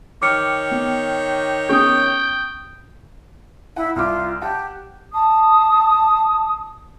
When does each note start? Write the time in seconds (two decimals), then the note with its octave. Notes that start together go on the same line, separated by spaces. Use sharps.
0.22 D#3 G4 C#5 D6 F6 C#7
0.72 B3
1.69 B3 C#4 G#4 G5 C#6 D#6
3.76 E4 F#5
3.96 C2 F4 D6
4.42 G4 F#5 A5
5.13 A5 D#6